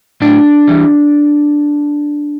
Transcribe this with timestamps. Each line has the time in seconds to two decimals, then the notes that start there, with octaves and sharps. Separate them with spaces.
0.22 A2 D4 D5
0.68 E3 G3